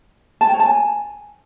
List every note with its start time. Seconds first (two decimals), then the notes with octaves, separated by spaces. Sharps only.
0.41 A5
0.47 G5
0.53 C#5
0.60 A5
0.66 G#5